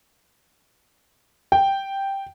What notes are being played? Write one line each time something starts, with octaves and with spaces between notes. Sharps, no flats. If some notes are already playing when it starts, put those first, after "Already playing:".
G5